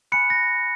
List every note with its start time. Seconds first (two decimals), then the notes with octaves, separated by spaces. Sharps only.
0.12 G#5 B5 F#6 C#7
0.30 A#6